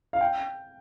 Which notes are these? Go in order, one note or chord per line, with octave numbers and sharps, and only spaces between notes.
F5
G5